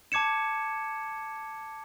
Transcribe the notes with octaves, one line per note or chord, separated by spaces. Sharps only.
A5 D6 G#6 C#7 E7